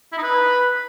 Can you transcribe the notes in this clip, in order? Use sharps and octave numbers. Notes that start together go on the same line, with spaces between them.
E4
D#4
B4